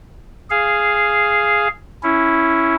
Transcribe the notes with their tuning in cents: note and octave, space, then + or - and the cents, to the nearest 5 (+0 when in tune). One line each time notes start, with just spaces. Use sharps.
G#4 +0 F5 -10
C#4 +0 E4 +0